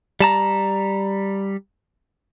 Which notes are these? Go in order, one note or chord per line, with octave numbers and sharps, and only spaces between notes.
G3 A5 A#5